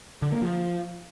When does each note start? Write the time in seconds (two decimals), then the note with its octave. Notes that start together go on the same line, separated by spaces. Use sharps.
0.22 D3
0.32 A#3
0.42 F3